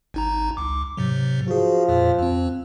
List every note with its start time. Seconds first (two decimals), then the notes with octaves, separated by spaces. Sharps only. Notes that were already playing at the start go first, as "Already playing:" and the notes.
0.14 G#1 D#4 A#5
0.57 C#2 D6
0.97 G#2 C3 F#3
1.48 F3 F#4 G#4
1.89 F2 A#2
2.19 F2 C4